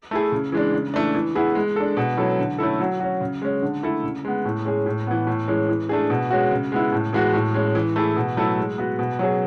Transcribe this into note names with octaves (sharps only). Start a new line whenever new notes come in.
A3 E4 G#4
C#3
E3 G#3 D4
C#3
E3 A3 D4
E3
B3 E4 G#4
G#3
D4 A4
B2
F#3 C#4 E4 A4
D3
A3 C#4 E4 A4
F#3
C#4 F#4
C#3
G#3 C#4
D3
A3 E4 A4
C#3
G#3 B3
A2
G#3 C#4 G#4
A2
E3 B3
A2
E3 G#3 C#4
E3
A3 D4 G#4
B2
G#3 C#4 F#4
C#3
G#3 B3 E4
A2
E3 G#3 B3 F#4
A2
G#3 C#4
E3
A3 E4 G#4
B2
F#3 A3 E4 A4
G#3
B3 F#4
B2
F#3 C#4 G#4